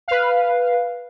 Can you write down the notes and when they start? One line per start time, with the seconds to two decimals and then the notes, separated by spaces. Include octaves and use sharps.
0.08 B4 F5